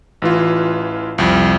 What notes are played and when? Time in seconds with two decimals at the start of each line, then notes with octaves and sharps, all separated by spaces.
0.22 A1 E3 F4
1.18 C2 F2